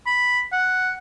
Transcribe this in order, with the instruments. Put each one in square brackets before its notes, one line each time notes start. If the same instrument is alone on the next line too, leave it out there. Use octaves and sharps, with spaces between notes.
[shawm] B5
F#5